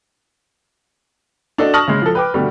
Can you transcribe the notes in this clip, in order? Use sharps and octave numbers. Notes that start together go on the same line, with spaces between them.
D4 F#4 A4 D#5
A5 C#6 D#6 F6 A#6 F#7
C#3 G#3
F3 A4
B4 G5 D6
B2 D3 G3 A3